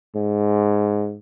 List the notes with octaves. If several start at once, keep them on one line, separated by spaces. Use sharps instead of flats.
G#2